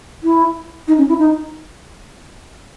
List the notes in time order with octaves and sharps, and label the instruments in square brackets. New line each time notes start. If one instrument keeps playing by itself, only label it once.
[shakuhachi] E4
D#4
C#4
E4
D#4